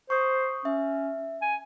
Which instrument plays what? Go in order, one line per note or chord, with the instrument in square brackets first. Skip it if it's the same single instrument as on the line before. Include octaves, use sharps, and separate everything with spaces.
[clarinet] C5 [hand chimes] C#6 D#6
[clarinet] C#4 [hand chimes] E5
[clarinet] G#5